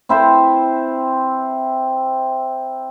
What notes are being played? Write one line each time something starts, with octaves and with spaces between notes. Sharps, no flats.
C4 E4 C5